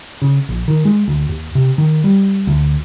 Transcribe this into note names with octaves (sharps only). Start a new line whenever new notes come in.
C#3
A#1
D#3
G#3
D2
D#2
C3
D#3
G3
D2